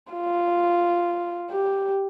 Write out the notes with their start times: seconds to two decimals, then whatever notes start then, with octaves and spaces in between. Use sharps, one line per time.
0.12 F4
1.50 G4